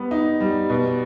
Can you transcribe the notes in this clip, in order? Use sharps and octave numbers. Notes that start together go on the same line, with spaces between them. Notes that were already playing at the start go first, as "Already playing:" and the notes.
Already playing: G3 B3
D#4
G3
B2